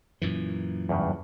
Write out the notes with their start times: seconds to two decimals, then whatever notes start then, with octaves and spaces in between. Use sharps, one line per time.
0.22 F#2 A#2 E3
0.89 E2 G2 C#3